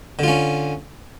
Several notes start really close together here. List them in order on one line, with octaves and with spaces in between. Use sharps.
D3 F4 C#4